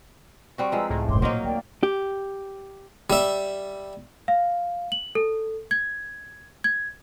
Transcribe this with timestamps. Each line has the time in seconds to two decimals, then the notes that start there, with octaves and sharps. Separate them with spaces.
0.58 G3 C4 F#4 C#6
0.72 F3 G#3 B4 A#5 E6
0.89 C#2 A2 A#5
1.09 F1 G2 C5 C6 D6
1.22 A#2 F#3 A#3 D#4
1.44 D2 D5 G5
1.83 G4
3.10 G3 E5
4.28 F5
4.92 F#7
5.15 A4
5.71 G#6
6.64 G#6